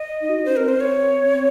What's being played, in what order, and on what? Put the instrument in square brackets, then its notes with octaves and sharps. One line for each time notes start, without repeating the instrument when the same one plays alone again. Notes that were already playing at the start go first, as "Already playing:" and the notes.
Already playing: [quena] D#5
[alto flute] D#4
F#4
D#4
[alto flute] C#4 [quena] C5
[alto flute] C4 [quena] A#4
[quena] C5
C#5
[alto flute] C4